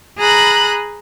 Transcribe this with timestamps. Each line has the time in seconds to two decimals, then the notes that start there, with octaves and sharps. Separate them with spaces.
0.18 G#4 A#5 B5 F#6